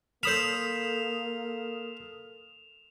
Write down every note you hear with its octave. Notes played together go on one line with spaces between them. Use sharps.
A#3 A4 C5 B5 D#6 F6 E7 F7